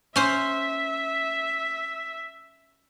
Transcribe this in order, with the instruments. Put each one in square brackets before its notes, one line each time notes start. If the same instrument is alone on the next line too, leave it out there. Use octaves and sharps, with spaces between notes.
[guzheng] C#4 C5 [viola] E5